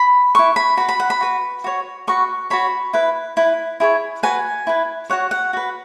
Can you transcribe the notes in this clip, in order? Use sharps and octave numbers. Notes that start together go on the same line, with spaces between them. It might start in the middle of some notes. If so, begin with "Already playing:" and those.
Already playing: B5
E4 B4 C#6
B5
F#4 B4 B5
B5
F#5
B5
F#4 B4
F#4 C#5
F#4 B4 C#6
F#4 C#5 B5
E4 B4
E4 B4
E4 G#4 C#5
F#4 B4 G#5
E4 B4
F#4 C#5 F#5
F#5
F#4 B4